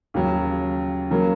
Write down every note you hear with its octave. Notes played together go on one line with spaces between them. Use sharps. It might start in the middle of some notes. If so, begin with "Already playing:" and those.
D#2 C#3 F#3
C#3 F#3 A#3